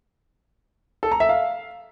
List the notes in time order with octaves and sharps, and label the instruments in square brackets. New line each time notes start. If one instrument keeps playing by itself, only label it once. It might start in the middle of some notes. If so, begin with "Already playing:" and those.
[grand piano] A4
A#5
E5
F5